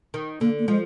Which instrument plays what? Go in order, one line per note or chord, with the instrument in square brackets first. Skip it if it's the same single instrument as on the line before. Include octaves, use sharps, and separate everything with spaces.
[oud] D#3
[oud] D3 [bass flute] A#3
[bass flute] A#3
[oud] F3 [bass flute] G#3